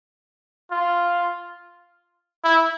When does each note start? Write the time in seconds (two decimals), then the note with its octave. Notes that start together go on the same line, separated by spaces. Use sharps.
0.71 F4
2.44 E4